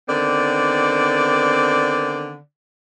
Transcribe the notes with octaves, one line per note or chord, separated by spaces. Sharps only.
D3 D#3 B3 C4 D5